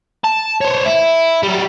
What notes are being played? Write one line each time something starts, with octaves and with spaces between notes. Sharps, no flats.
A5
C5 C#5
E4
F#3 G3